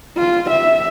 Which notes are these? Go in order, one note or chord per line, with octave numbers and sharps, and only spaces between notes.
F4
E5